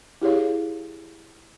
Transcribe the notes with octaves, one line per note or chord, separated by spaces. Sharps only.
E4 G4 G#4 C#5 F5